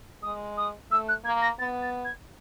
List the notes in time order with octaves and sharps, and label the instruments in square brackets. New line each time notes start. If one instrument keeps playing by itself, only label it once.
[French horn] G#3 [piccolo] D#6
[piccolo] D#6
[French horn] A3 [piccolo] E6
[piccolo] F#6
[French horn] A#3 [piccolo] G#6
[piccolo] A#6
[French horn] B3 [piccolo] A6
[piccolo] A6
G#6